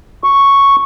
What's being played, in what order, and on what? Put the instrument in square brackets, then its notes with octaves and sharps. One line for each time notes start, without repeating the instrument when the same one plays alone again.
[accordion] C#6